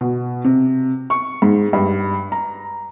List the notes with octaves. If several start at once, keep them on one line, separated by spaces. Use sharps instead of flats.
B2
C3
C#6
G#2
G2
A#5